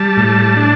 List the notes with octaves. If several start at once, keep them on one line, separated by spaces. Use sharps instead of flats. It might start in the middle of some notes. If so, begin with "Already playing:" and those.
Already playing: G3 A5
A2
D4